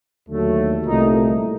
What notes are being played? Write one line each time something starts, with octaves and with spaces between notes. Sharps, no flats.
D#2 D3 F#3 A3
C2 A#2 A3 D#4